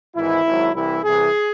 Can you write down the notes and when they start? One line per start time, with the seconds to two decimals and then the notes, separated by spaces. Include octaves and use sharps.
0.16 G#1 G#2 E3 E4
0.44 G#1 G#2 F#3
0.74 C2 C3 E3 E4
1.04 C2 C3 E3 G#4